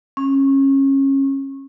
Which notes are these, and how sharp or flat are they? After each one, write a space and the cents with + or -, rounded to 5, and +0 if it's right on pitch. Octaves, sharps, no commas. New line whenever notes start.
C#4 -25